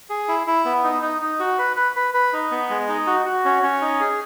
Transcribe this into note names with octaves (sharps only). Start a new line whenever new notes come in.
G#4
E4
E4
B3
D#4
D#4
D#4
F#4
B4
B4
B4
B4
D#4
B3
G#3
D#4
F#4
F#4
C#4
C#4
D#4
G#4